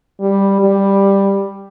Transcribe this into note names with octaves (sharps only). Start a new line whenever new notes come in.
G3
G3